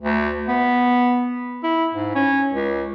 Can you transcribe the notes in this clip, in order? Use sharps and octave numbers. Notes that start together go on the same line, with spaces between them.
D2
B3
E4
G#2
C#4
C#2